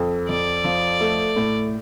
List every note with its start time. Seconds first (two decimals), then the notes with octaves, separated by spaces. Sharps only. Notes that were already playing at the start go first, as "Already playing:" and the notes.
Already playing: F2
0.29 F2 D5
0.64 F3
1.01 A3
1.36 A2